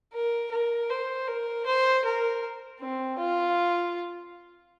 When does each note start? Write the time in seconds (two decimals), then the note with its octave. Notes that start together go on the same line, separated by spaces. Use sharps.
0.13 A#4
0.52 A#4
0.90 C5
1.28 A#4
1.66 C5
2.05 A#4
2.80 C4
3.19 F4